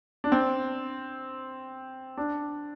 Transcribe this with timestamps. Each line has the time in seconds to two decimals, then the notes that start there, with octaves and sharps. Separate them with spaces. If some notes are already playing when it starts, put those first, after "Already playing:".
0.24 D4
0.32 C4
2.17 D4